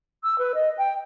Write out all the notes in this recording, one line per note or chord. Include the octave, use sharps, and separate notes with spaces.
E6
B4
D#5
G5